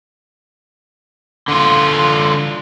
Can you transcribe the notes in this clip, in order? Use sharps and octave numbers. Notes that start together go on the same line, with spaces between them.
D3 F4